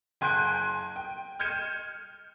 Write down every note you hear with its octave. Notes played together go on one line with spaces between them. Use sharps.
F#1 G#5 C6 F#6 G6 D7
G5
F6 G6 G#6 C#7 D#7 E7